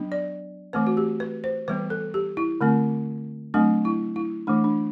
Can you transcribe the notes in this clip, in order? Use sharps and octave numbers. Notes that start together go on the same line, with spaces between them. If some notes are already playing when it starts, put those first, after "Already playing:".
Already playing: F#3 B3 D4
D5
E3 A3 C4 B4
F#4
G4
B4
C5
E3 G3 B3 B4
A4
G4
E4
D3 A3 C4
F#3 A3 C4 D4
E4
E4
E3 A3 D4
D4